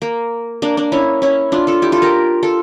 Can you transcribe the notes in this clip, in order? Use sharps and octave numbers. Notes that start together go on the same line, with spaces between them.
A#3
A#3 D4
A#3 D4
C#4 E4
C#4 E4
D4 F4
F4 A4
E4 G4
F4 A4
G4 A#4
F4 A4